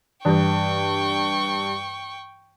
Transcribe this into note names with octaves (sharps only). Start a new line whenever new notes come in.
G2 E3 B4 G5 C#6